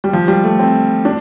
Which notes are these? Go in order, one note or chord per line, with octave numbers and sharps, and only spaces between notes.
G3
F3
G3
A3
C4
D4